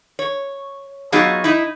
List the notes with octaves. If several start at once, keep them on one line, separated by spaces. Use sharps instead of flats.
C#5
F#3 B3 D#4 F4 F#4 G#4
D#4 E4